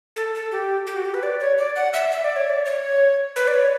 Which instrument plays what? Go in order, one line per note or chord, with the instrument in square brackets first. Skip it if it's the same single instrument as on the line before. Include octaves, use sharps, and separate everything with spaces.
[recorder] A4
A4
G4
G4
F#4
G4
B4
D5
C#5
D5
F#5
E5
E5
D5
C#5
D5
C#5
B4
D5
C#5